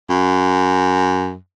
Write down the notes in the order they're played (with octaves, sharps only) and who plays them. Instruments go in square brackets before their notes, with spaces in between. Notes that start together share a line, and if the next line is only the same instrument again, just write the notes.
[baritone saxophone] F#2